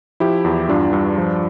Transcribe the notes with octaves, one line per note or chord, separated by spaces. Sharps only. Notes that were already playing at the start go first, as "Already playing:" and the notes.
F3 E4 G4
E2
G2 D4 F4
G2
F3